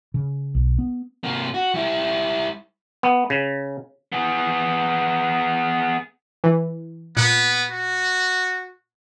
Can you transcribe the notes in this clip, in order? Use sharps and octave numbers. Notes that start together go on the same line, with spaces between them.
C#3
B1
B3
C3 A#3
F#4
G3 E4
B3
C#3
B3 G#4
E3
A#2 B3 F#6 C#7
F#4